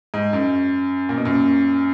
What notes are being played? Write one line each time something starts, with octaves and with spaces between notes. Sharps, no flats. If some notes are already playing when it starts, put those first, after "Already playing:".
G#2
F#2
A#2
B2
F#2 A#2